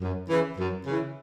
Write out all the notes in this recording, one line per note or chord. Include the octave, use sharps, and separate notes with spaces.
F#2
C#3 E3
F#2
C#3 E3